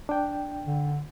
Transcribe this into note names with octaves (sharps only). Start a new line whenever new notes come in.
D4 G5
D3